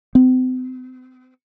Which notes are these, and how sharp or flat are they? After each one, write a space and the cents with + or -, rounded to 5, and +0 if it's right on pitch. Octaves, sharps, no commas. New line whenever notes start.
C4 -40